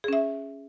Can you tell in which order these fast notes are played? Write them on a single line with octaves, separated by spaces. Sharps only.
G#4 C#4 E5